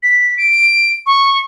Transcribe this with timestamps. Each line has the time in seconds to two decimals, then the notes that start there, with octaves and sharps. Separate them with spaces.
0.03 B6
0.38 D7
1.06 C#6